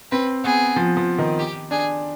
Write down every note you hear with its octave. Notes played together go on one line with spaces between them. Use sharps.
C4 B4
B3 G#4
F3
F3
D#3
G4
D4 G#4